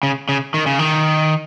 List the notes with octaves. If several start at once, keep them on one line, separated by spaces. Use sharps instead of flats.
C#3
C#3
D#3
C#3
D#3